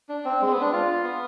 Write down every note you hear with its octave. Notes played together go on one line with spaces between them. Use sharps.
D4
C4
G#3
C4
B3
D4
F4
B3